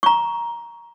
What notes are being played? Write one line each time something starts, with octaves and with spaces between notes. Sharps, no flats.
A#5 C#6